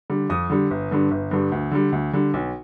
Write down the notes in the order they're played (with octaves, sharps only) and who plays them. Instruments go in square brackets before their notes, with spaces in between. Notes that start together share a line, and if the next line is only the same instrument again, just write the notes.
[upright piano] D3 G3
F2 D#6
D3 G3
G1
G2 D3 G3
G1
G2 D3 G3
D2
D3 G3
D2
D3 G3
B1